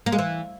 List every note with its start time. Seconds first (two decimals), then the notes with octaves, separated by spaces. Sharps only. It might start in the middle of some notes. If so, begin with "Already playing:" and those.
0.06 A#3
0.12 G#3
0.19 E3